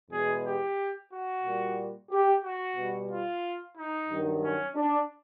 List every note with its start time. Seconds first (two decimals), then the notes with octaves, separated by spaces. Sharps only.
0.10 E2 B2 G#3 G#4
0.44 G4
1.11 F#4
1.44 A#2 G3
2.10 G4
2.43 F#4
2.76 B2 G3
3.09 F4
3.76 D#4
4.09 G2 D#3 F#3
4.42 C#4
4.76 D4